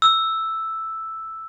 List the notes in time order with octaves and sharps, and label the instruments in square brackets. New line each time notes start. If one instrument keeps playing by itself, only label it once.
[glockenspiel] E6